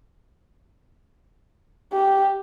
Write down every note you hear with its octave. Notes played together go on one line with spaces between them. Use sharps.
G4